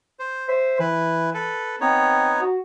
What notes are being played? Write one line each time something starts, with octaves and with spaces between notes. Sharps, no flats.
C5
C5 E5
E3 E4 B4
A4 B4
B3 C4 D#4 C#5
F#4